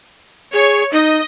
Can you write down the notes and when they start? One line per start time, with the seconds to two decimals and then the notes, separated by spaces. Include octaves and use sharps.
0.53 G#4 C#5
0.92 D#4 D#5